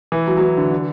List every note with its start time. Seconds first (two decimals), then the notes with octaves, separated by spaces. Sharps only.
0.12 E3
0.27 F#3
0.37 F#3
0.41 E3
0.57 D3
0.71 D3